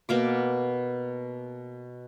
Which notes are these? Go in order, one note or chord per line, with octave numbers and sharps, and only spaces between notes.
B2 A#3 D6